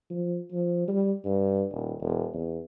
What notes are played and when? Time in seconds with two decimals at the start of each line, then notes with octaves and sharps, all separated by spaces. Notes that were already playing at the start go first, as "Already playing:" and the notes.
0.10 F3
0.52 F3
0.88 G3
1.25 G2
1.71 D#1
2.01 E1
2.34 E2